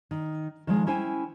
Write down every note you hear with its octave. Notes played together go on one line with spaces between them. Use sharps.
D#3
D#3 F3 G#3
C#4 E4 C5 G5 G#5